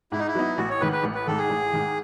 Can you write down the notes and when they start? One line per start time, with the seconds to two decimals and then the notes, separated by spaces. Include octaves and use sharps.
0.12 G#2 E4
0.19 D#4
0.27 E4
0.35 F#3 B3 D#4
0.57 A1 F#4
0.70 C#5
0.81 G#2 D#3 B4
0.92 B4
1.03 A1
1.15 B4
1.27 G#2 D#3 A4
1.38 G#4
1.49 A1
1.73 G#2 D#3